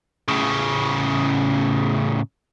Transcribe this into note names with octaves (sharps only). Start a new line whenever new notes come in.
A2 C#3